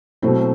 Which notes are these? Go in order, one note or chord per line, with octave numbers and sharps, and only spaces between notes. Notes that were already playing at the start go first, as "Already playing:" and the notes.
B2 F#3 A3 C4 E4